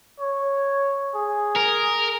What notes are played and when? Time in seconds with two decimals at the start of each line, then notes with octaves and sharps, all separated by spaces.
0.20 C#5
1.15 G#4
1.56 A#4